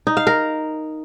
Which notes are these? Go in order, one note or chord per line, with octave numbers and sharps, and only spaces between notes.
D#4
F5
A#4